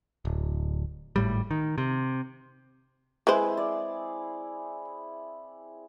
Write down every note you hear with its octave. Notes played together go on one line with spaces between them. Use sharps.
D1
G#1 A2 G3
D#3
C3
G#3 C4 E4 G#4 B4 C5
D5